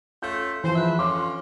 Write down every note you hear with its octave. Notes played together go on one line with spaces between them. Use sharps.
A3 C#4 F4 G6
E3 F3 C5
G#2 B4 E5
D3 C#4 F4 C6 D6